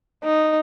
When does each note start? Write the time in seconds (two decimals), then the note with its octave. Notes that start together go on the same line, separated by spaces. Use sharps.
0.24 D#4